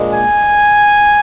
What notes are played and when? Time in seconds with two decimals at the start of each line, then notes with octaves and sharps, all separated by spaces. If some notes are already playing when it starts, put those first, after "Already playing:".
Already playing: A#2 G#3 D4
0.12 G#5